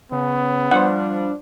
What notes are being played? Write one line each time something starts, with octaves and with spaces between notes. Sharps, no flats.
C#3 B3
F3 G3 D4 C5 F#5